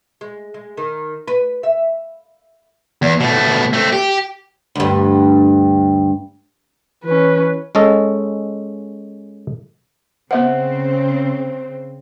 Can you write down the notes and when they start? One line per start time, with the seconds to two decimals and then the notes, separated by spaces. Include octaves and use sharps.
0.21 G#3
0.54 G#3
0.77 D#3
1.27 B4
1.63 E5
3.02 E2
3.20 B2 A3
3.73 A3 C4
3.93 G4
4.75 D2 G2
7.04 E3 C#4 B4
7.75 G#3 C#4 A4 D#5
10.31 C#3 B3 C4 C5 E5 F#5